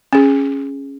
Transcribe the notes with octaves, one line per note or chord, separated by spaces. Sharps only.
C#4 G#4